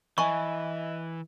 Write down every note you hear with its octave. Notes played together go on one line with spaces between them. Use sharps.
E3 D#5 E5 G#5 B5 C#6